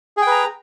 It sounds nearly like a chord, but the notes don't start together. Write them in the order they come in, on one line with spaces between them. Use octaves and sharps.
G#4 G5 B4 A#5